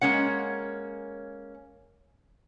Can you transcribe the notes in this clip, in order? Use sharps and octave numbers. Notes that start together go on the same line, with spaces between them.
G#3 A#3 C#4 F#5